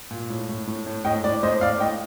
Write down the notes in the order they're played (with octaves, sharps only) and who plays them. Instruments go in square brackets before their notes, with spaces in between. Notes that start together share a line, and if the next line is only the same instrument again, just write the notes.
[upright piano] A#2
A2
A2
A2
A2
A2 D#5 G5
A2 D5
A2 C5 D#5
A2 D5 F5
A2 D#5 G5